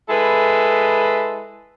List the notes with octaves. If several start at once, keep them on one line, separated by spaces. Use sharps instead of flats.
G#3 E4 A4 B4